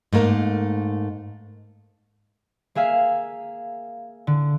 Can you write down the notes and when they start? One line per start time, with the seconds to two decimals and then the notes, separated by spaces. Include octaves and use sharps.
0.13 G#2 A3 A#3 A#4
2.75 A#3 G#4 E5 F5
4.27 D3